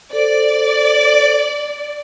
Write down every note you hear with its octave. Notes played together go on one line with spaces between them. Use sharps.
A4 C5 D5